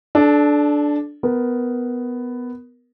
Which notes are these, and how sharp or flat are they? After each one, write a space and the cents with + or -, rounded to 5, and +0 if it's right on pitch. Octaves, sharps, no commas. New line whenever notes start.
D4 +0 A4 -30
B3 +10 A#4 +15